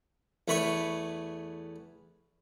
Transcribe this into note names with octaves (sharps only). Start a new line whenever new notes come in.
E2 A3 B4 C#5 C#6